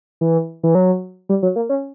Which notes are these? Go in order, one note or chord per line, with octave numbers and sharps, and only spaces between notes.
E3
E3
F#3
G3
F#3
A#3
C#4